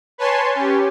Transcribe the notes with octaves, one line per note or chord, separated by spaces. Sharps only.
B4 C#5 G#5 A5 C6
C#4 G4